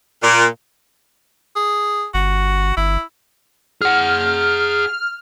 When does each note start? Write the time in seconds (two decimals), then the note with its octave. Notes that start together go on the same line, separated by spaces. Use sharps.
0.23 A#2
1.55 G#4
2.14 G1 F#4
2.77 G1 E4
3.81 G#4 F#5 F6